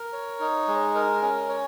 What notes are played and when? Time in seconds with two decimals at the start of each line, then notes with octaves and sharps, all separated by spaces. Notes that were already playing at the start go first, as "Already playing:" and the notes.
Already playing: A#4
0.13 C#5
0.40 D#4
0.68 G#3
0.95 A#4
1.22 C#4
1.49 C#5